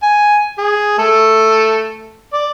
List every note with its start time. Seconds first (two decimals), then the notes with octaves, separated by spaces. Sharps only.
0.03 G#5
0.58 G#4
0.99 A3 A4
2.33 D5